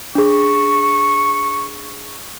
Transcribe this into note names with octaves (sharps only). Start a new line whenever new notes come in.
D4 G#4 C#6